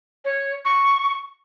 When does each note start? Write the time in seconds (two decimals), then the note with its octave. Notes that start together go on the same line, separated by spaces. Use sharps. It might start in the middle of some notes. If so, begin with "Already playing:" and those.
0.25 C#5
0.65 C#6